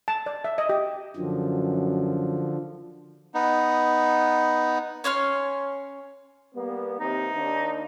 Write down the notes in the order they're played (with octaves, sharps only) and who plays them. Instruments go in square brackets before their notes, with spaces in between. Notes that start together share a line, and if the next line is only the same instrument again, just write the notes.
[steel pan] A5
D5
E5
D#5
G4
[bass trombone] F#2 [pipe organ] D3 F3
[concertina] B3 D#4
[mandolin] C#4 C#5 C6 F6
[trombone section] G3 A#3 B3
[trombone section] D#2 C3 [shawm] D#4
[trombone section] D#2 D4